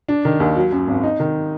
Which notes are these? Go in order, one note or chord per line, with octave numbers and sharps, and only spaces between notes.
D4
D#3
D#2
F#3
F#2
G#1
D#4
D#3